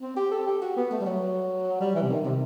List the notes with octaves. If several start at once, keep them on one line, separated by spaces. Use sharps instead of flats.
C4
G4
A4
G4
F#4
B3
A3
G3
F#3
G3
E3
C3
D#3
C3